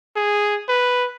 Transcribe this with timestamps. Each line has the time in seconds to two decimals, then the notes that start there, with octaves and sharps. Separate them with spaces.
0.16 G#4
0.69 B4